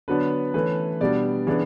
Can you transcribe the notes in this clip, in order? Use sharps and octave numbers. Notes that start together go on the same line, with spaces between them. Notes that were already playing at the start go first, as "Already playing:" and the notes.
D3 F#3 B3 D4 B4
E3 A3 C#4 B4
B2 G3 B3 D4 D5
C#3 E3 B3 D4